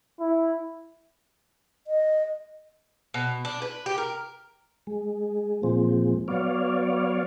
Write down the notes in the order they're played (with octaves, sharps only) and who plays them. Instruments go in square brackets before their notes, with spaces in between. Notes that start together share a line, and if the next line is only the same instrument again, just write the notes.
[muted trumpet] E4
[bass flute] D#5
[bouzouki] B2
D4
B4
G4
A#4
[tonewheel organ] G#3
A#2 F3 G#3 C4
F#3 B3 C#5 D5 F5